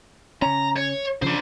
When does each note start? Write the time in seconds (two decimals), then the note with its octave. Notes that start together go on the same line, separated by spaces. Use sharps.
0.42 C#3 C#4 A#5
0.76 C#5
1.22 C#3 F3 D4 C5